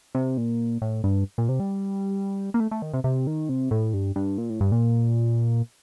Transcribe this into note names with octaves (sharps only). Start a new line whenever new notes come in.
C3
A#2
A2
G2
A#2
C3
G3
A#3
A3
A3
D#3
C3
C3
D#3
C3
A2
G2
G2
A#2
A2
G2
A#2